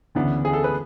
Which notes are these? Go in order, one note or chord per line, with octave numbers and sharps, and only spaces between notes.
D2 C#3 E3 B3 D4
G#4
A4
B4